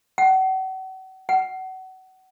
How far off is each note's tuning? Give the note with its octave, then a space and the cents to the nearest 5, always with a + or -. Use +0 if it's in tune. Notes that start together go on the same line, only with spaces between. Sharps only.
F#5 +40
F#5 +30